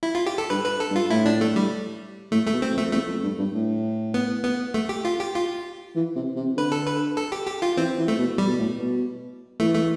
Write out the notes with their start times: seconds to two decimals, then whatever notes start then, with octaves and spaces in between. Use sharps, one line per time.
0.03 E4
0.15 F4
0.26 G4
0.38 A4
0.50 G2 B4
0.65 B4
0.80 A4
0.90 G2
0.96 F4
1.10 A2 E4
1.26 D4
1.41 A3
1.56 G3
2.32 A2 A3
2.47 A3
2.53 B2
2.62 C4
2.72 F2
2.78 A3
2.86 F2
2.92 E2 A3
3.07 F2
3.23 G2
3.38 G2
3.53 A2
4.14 B3
4.44 B3
4.74 A3
4.89 G4
5.05 F4
5.20 G4
5.35 F4
5.95 E3
6.16 C3
6.36 C3
6.56 D3 B4
6.72 A4
6.87 B4
7.17 A4
7.32 G4
7.47 G4
7.62 F4
7.77 E3 C4
7.98 E3
8.08 A3
8.18 B2
8.38 G3
8.47 B2
8.59 A2
8.78 B2
9.60 E3 A3
9.75 A3